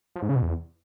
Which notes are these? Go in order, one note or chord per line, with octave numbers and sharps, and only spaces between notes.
F3
G#2
C#3
B2
E2